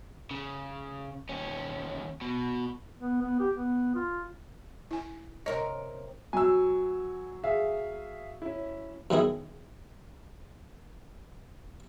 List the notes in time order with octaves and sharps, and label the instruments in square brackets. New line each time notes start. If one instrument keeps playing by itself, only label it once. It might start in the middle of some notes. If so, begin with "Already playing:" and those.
[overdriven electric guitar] C#3
D#2 C#4
B2
[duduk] B3
B3
G4
B3
F4
[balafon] E4 G#5
[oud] C3 A#4 C#5 [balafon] D#5
[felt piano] F#3 [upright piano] G#5 E6
[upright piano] G#4 E5 F5
C#4 E4
[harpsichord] F#2 D#3 B3 E4 G#4